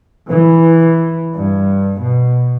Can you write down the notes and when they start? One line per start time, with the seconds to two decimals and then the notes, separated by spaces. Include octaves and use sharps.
0.30 E3
1.35 G2
1.99 B2